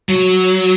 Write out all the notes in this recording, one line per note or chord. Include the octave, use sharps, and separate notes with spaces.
F#3